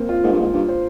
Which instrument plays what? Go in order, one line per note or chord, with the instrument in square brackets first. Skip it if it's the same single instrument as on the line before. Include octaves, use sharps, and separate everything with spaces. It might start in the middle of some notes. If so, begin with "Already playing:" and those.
Already playing: [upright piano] A#3 C4
F4
[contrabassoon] G#2 [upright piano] A#3
[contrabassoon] G2
[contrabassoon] G#2 [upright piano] A#3
[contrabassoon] G2 [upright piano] F4
[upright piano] C5